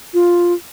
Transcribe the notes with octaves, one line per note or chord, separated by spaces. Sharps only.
F4